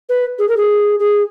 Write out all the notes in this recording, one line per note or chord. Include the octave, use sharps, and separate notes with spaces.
B4
G#4
A#4
G#4
G#4